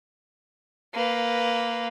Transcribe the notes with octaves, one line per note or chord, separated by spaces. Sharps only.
A#3 B4